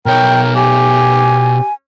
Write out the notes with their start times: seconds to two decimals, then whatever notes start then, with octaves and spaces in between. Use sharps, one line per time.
0.06 B2 A#4 C#5 G5
0.55 G4 G#5